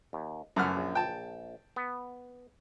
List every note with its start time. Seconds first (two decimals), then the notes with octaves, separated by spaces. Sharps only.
0.13 D#2
0.56 F#2 E3 A3 F#5 F6
0.77 A#1
0.95 G5 A5
1.76 B3